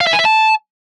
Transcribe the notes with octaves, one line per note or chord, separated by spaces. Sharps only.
F5
E5
G#5
E5
A5